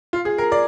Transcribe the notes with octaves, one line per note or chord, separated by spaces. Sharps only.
F4
G#4
A#4
D5